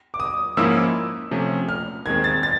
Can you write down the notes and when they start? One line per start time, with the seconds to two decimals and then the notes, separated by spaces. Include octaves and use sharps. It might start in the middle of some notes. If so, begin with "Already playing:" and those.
0.14 D6
0.20 D#6
0.57 G#2 F3 A#3 C#4 E4 E6
1.31 C3 F3 A3 C#4
1.69 F6
2.06 D#2 D#3 G#3 C4 G#6
2.24 A6
2.43 A6